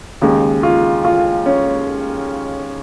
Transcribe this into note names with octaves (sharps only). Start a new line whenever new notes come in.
D#2 C#3 G#3
F4
F4
C#4